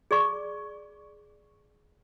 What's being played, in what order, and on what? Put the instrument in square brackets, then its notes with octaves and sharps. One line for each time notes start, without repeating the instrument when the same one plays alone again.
[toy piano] G#4 D5 C#6